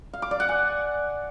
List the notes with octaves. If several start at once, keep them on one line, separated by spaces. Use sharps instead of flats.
F5
D6
D5
F#5
G#5